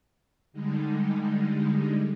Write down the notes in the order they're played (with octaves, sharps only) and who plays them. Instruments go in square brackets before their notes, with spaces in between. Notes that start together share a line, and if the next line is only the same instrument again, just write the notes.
[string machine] D3 G3 G#3 D#4